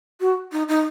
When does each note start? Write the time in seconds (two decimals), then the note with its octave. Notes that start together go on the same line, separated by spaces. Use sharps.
0.21 F#4
0.52 D#4
0.68 D#4